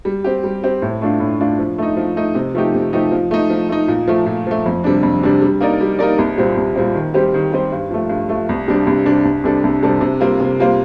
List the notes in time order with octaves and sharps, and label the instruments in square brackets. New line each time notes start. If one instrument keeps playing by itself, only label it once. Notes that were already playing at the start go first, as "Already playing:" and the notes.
[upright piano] G3
C4 G4
G3
C4 G4
A2
A3 D4 F4
A2
A3 D4 F4
F3
A3 D#4
F3
A3 D#4
C3
F3 A3 D#4 G4
C3
F3 A3 D#4 G4
F3
A3 D#4
F3
A3 D#4
A#2
F3 A3
A#2
F3 A3
F2
C3 G3 D4
F2
C3 G3 D4
G3
A#3 D#4 A#4 D5
G3
A#3 D#4 A#4 D5
C2
A#2 G3 C4
C2
A#2 G3 C4
D#3
G3 C4 G4 C5
D#3
G3 C4 G4 C5
G2
F3 A3
G2
F3 A3
C2
C3 G3 D4
C2
C3 G3 D4
C2
C3 G3 D4 A4
C2
C3 G3 D4 A4
C3
G3 A#3 F4 C5
C3
G3 A#3 F4 C5